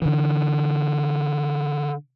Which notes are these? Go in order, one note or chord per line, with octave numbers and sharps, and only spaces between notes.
D3 E3